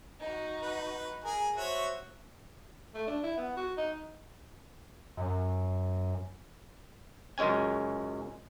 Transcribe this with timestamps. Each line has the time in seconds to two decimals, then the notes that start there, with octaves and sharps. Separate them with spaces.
0.19 D#4 F#4
0.62 B4
1.24 G#4 A#4 G#5
1.57 F#4 C5 C#5 E5
2.95 A3
3.07 D4
3.23 E4
3.37 B3
3.56 F#4
3.77 D#4
5.17 F#2
7.38 C#2 F#2 G#3 C#4 G#5